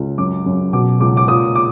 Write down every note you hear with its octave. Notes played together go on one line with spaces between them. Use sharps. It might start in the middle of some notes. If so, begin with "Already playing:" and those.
Already playing: C#2
F#2 D6
F#2
B2 D6
C#2 D6
D6
A#2 D#6
D6